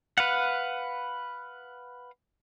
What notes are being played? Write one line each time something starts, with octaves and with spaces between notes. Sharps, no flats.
B4 F5 F#5